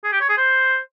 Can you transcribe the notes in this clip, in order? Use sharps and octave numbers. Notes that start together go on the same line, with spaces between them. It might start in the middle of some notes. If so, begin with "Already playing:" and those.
G#4
G4
C#5
G#4
C5